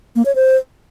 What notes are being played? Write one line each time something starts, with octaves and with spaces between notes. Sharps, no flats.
A#3
C#5
C5